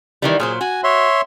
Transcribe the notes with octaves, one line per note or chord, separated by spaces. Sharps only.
D#3 E3 G3
A#2 F#3 G#4 C5
F#4 G#5
C#5 E5 C6